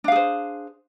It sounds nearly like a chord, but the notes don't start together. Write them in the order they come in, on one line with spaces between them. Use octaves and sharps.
D4 F5 G#4 C5